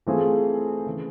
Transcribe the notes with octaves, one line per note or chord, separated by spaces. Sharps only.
E3 A3 C4 F4 G#4
C#3 E3